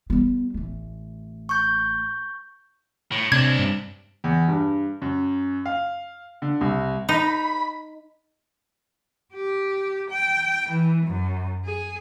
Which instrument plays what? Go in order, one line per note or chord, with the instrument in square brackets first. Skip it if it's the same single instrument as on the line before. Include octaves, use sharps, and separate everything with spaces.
[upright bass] G3 B3
A1 A3
[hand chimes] C#6 G6
[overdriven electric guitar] A2
[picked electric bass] C3 [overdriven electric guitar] C4 D4 [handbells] G#6
[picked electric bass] G2
[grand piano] E2
G2
F#2
F5
D3
C2
[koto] D#4 [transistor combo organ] B5
[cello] G4
G5
E3
F#2
G#4